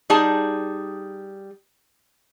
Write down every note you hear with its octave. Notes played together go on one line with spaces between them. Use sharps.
G3 D#4 G#4 A5